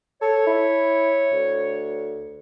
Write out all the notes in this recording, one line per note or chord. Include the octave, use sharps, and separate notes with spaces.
A4 C#5
E4
D2